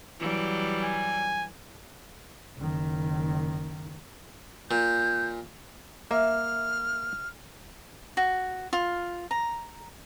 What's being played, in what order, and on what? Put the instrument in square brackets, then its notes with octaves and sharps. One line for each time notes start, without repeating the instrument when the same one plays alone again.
[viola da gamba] E3 F#3 G3
[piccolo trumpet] G#5
[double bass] F#1 D#3
[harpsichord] A#2 [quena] G6
[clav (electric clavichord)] A#3 [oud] E5 [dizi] F6
[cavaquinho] F#4
F4
A#5